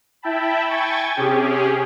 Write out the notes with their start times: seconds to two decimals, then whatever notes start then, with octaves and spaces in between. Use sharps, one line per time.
0.22 E4 E5 G5 A5 B5
0.68 G5 G#5 C#6 G#6 A6
1.17 C3 C#4 G4 G#4